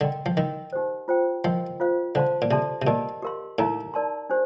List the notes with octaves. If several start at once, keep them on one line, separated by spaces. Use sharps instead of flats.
D3 A#4 D#5 G5 C6
F3
D#3 A#4 D#5 G5 C6
D#4 G4 C5
F4 C5 G5
F3 A#4 D#5 G5 C6
F4 C5 F5
D3 C5 F5 A5 C6
A#2
C3 A4 D5 A5 C6
C3
A#2 G4 A#4 D#5 A5
G4 A#4 F5 C6
A2 D#4 A#4 F5 A#5
D#4 A#4 D5 A5 C6
D4 G4 C5